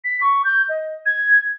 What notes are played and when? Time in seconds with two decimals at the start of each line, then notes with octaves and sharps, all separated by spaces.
0.04 B6
0.21 C#6
0.45 G6
0.69 D#5
1.06 G#6